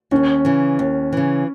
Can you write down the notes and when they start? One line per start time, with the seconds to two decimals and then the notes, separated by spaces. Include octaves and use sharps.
0.11 D#2 C#4
0.45 C#3 E3
0.79 D#2
1.13 C#3 E3